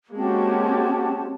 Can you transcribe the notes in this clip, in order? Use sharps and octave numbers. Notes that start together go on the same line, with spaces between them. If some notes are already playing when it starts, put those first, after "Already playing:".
G#3 A#3 C4 C#4 F#4 G4 A5